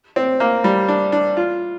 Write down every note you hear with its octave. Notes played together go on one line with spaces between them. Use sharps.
C4
A#3
G3
D4
D4
F4